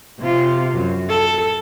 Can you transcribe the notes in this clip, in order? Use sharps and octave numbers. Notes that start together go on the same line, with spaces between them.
C3 F4
F#2
A4